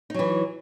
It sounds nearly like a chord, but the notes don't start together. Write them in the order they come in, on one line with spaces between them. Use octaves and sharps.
D#4 F#3 E3